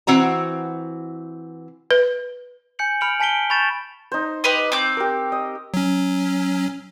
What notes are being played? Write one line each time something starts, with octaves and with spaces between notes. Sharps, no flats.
E3 C4 F#4 A#5
B4
G#5 G6 C#7 F#7
B5 F6 C#7 D7 F#7
G#5 A5 B6 D7 G7
B5 C#6 G6 A6 D7 E7
D#4 C5
G4 B4 D#5
C4 D6 G6
G4 A#4
D#5
F#3 C#4